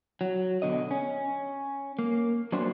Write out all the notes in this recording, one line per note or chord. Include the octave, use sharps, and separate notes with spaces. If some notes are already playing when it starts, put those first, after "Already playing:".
F#3
B2 D3 D#5
C#4
A#3
F#3 A3 A#3 C#4 D4 C5